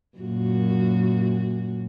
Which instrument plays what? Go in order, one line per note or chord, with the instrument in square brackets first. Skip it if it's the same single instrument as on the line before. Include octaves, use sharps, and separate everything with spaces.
[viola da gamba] F#2 A#2 F#4